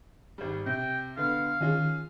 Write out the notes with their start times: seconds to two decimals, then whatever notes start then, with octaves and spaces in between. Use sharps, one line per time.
0.38 G#1 G3
0.66 C3 G5
1.17 D3 B3 F5
1.61 D#3 C#4 F4 G#4